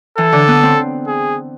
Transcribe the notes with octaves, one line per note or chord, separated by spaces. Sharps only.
E3 A4
D3
B3
C4
G#4